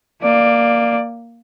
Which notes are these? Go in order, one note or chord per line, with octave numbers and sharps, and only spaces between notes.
A#3 D5